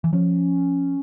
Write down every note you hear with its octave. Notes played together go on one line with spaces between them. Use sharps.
E3
F3 C#4